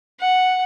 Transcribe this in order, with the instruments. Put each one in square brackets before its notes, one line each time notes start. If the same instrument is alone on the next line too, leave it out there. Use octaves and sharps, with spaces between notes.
[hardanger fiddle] F#5